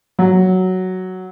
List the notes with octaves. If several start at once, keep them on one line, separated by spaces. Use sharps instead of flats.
F#3